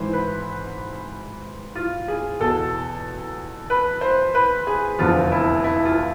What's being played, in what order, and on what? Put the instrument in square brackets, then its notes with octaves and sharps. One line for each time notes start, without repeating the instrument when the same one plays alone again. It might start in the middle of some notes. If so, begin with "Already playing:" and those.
Already playing: [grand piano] G#1 G#2 E3 C5
B4
F4
G#4
E2 B2 A4
B4
C5
B4
G#4
F1 E2 D3 F3 F4
E4
E4
F4